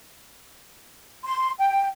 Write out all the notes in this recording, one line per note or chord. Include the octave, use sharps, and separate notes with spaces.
C6
G5